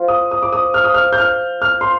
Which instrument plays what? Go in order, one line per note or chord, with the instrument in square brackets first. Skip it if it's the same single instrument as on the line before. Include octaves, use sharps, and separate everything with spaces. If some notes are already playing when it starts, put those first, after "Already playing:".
Already playing: [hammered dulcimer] F3 F4
[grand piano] D#6
D#6
D6
D#6
F6
D#6
F6
G6
F6
F6
C6